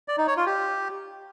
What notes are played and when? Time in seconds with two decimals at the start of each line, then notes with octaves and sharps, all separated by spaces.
0.08 D5
0.18 D#4
0.27 C#5
0.37 F4
0.46 G4